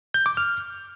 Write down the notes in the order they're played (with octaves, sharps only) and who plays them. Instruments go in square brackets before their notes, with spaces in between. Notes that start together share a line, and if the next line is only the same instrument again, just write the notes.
[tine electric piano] G6
D6
F6